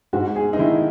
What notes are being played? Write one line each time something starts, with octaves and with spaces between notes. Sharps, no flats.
G#2 F#4
G#4
D#4
D#3 E4